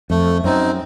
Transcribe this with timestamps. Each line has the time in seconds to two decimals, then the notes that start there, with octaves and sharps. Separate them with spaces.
0.10 F2 A3
0.44 F#2 C4 D#4